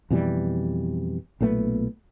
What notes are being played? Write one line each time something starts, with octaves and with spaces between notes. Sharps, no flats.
F2 B2 E3 G3
B1 A#2 A3 B3